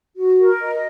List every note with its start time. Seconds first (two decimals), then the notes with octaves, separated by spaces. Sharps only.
0.16 F#4
0.39 A#4
0.61 D#5